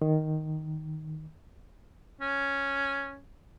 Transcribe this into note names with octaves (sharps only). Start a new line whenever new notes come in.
D#3
C#4